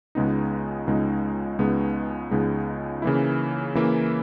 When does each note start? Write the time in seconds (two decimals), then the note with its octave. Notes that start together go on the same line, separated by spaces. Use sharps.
0.15 C#2 C#3 G#3 B3 D#4
0.87 C#2 C#3 G#3 B3 D#4
1.59 C#2 C#3 G#3 B3 D#4
2.31 C#2 C#3 G#3 B3 D#4
3.02 C#3 E3 A#3 E4
3.75 C#3 E3 A#3 E4